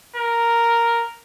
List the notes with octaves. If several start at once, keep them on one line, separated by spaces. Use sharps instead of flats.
A#4